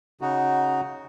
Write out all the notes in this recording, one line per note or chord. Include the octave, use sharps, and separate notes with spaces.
C#3 D#4 F#4